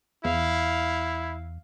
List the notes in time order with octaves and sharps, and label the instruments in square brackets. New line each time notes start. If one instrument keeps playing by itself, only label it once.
[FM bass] E2 [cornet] E4 [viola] F5